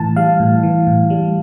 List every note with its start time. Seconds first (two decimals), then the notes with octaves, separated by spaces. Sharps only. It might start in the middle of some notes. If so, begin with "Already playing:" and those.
Already playing: A2 E3 A5
0.16 G3 F5
0.40 A2
0.63 E3
0.87 A2
1.10 G3